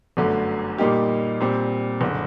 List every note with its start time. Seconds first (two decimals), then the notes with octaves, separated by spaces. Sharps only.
0.17 G1 F#2 D3 A3
0.78 A#2 G3 A#3 D#4 G4
1.40 A#2 G3 C4
2.01 F#1 D3